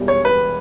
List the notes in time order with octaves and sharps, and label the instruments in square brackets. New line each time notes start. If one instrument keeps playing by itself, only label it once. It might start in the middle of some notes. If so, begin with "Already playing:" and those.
Already playing: [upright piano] E1 E2 B2 G3
C#5
B4